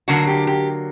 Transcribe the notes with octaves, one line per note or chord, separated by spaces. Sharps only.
D3 F#3 A#3 F#4
G4
G4